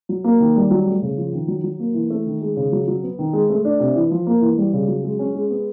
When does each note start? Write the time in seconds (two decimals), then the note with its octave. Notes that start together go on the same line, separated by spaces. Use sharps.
0.09 F#3
0.24 A#3
0.40 D#3
0.56 G3
0.71 F#3
0.87 A3
1.02 C#3
1.18 F3
1.33 D#3
1.48 F#3
1.64 F#3
1.79 A#3
1.94 E3
2.10 A3
2.26 D#3
2.42 G#3
2.56 C#3
2.72 F#3
2.88 F#3
3.03 B3
3.19 D#3
3.33 G#3
3.50 A3
3.65 D4
3.80 C3
3.96 E3
4.11 F3
4.27 A#3
4.41 E3
4.57 G3
4.73 C#3
4.88 F#3
5.04 G#3
5.19 C#4
5.35 G#3
5.50 B3